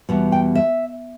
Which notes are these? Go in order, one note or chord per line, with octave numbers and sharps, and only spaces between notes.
E2 B2 G3
G5
E5